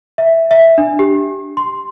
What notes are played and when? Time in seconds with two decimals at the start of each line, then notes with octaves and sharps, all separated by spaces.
0.18 E5
0.51 E5
0.78 D4
0.99 G4
1.57 C6